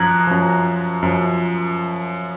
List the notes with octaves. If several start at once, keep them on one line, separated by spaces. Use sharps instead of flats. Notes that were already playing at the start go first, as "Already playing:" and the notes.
Already playing: F#2 F3 A#5 F#6 G#6
F#2 F3
F#2 F3